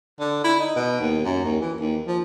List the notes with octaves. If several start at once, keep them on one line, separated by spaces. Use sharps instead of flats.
D3
E4
D#4
B2
D#2
F#2
D#2
E3
D#2
F3